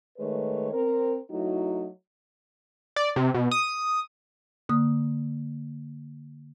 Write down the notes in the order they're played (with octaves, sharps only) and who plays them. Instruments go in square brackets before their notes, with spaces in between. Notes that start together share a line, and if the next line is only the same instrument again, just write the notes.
[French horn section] D#3 G#3 A3 B4 C#5
C4 A#4
F#3 A3 D#4 E4 F#4
[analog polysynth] D5
C3
B2
D#6
[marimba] D3 A#3 D#6